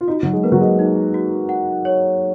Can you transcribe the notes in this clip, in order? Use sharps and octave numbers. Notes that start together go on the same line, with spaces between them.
F4
D#4 F#4
F#3
G#3
A#3 B4
F#3
G#3
D#4
F#4
F#5
C#5